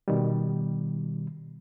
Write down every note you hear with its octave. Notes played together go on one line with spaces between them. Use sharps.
B2 D#3 G3